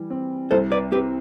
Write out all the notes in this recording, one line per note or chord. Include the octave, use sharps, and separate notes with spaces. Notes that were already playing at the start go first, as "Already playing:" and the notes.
Already playing: E3 G3
C4
C2 A4 C5
B4 D5
C4 G4 B4